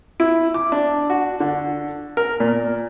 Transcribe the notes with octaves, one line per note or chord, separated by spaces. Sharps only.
E4
D6
D4
F#4
D3
A#4
A#2